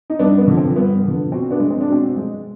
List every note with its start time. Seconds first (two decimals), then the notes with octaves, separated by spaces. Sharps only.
0.10 D#4
0.19 G2 B3 D4
0.38 B3
0.48 D3 F3
0.57 C4
0.76 G2 B3
1.04 D3 F3
1.32 B2 C4
1.50 B3 D4
1.60 G#3
1.70 C4
1.80 D4
1.88 B2 C4
2.16 G#3